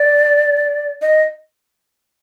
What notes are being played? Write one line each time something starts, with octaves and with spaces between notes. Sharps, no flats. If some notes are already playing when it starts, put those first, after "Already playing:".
Already playing: D5
D#5